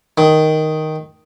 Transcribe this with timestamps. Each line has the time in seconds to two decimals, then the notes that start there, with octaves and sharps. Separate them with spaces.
0.18 D#3